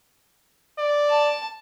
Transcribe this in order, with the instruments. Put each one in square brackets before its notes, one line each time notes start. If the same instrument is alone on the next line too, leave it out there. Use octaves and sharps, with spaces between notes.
[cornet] D5
[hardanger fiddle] A5